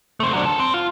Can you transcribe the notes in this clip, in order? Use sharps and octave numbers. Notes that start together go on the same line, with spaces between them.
A3 C4
F#3 D4
A4 A#4
C4
F4